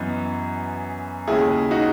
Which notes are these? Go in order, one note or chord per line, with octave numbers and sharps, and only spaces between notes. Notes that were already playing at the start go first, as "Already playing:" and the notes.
Already playing: F#2 E3 B3 D#5
D#2 C#3 G#3 C#4 E4 G#4
D#4 F#4